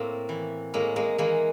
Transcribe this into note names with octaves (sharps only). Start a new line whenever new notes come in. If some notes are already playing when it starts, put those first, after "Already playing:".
Already playing: A2 A#3 C4
E3
A2 G#3 A#3
G#3 A#3
E3 G#3 A#3